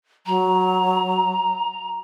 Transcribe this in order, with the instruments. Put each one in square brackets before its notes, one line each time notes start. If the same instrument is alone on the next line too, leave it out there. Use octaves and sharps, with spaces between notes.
[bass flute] F#3 [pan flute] A#5